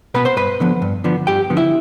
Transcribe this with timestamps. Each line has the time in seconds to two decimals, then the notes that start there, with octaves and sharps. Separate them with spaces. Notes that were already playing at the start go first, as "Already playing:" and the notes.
0.14 B2 B3 B4 B5
0.25 C5 C6
0.37 G2 B4 B5
0.60 D3 F3 B3
0.82 G2
1.04 D3 F3 B3
1.27 G2 G4 G5
1.50 D3 F3 B3
1.57 E4 E5